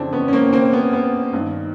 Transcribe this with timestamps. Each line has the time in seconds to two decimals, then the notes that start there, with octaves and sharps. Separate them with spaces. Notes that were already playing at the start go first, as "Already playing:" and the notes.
Already playing: F2 C#3 E3 C4 D4
0.13 B3 C#4
0.28 C#4
0.33 A#3 C4
0.53 A#3 C4
0.73 B3
0.93 B3
1.33 G2
1.38 D#3